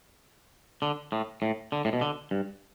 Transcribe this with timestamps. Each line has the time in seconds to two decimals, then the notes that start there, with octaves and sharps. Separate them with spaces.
0.82 D3
1.12 A2
1.42 A2
1.72 D3
1.85 A2
1.93 B2
2.01 D3
2.31 G2